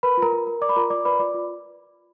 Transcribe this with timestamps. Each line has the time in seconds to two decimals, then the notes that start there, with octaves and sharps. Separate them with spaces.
0.03 A#4 B4 B5
0.17 F4 A#4 A#5
0.32 A#4
0.47 A#4
0.62 D5 D6
0.69 B5
0.76 F4 A#4 A#5
0.90 F4 D5 D6
1.05 B4 D5 B5
1.19 F4 D5 D6
1.34 F4